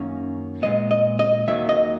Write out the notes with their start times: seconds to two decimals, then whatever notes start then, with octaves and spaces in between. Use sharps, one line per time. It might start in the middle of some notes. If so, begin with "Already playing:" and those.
Already playing: F#2 D#3 A#3 C#4
0.62 A#2 G#3 B3 D#5
0.91 D#5
1.19 D#5
1.48 D#2 D#3 F#3 A#3 E5
1.69 D#5